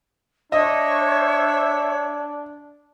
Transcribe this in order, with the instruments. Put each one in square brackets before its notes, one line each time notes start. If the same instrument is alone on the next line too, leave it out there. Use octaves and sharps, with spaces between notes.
[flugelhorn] D4 [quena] C#5 [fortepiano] D#5 [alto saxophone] E5